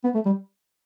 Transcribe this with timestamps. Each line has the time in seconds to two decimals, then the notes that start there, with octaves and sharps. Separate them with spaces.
0.04 B3
0.14 A3
0.25 G3